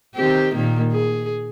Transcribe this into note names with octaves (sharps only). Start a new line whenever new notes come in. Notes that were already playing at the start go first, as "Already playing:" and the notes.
D#3 C4 G4
A#2 D#3 A#3
G#4